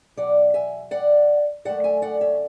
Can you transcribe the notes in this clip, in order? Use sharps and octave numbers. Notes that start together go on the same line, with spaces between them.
E2 B2 F#3 D5 F#5
E5 G#5
D5 F#5
F#2 D3 A3 D5 F#5
E5 G#5
D5 F#5
C#5 E5